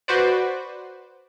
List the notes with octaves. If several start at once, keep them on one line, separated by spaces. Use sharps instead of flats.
F#4 B4 C5 D5